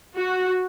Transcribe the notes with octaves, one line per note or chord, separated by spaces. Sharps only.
F#4